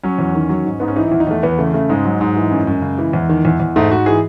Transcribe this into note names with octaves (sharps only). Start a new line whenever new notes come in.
F#3 C#4
E2
D#3
F#3
G#2
G#2 B3
C#4
E3 D#4
E2 E4
D#4
E2 A3
E2 B3
C#3 A3
C#3 A3
G#2 G#3
F#3
G#2
E3
F#2
F#2
C#3
E3
E2
D#3
E2
E2
G#2 A3
G#2 F#4
E3 G#4